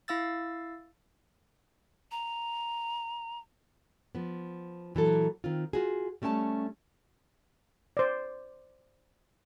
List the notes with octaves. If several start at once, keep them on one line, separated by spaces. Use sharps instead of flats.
E4 F5 E6 A6
A#5
F3 B3
A#2 E3 F#3 A4
D#3 C4 F4
F4 F#4 G#4
G3 A3 C#4 F#5 A5
C5 D5